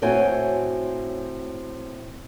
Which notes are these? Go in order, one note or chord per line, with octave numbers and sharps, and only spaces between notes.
A2 C4 F#4 C#5 G#5